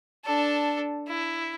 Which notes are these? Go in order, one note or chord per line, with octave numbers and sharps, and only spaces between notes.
D4 A4
E4